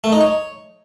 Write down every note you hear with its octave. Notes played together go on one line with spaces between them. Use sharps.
A3
D#4
C#5